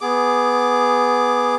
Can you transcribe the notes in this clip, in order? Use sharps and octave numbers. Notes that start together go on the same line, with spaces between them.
B3 G#4 D6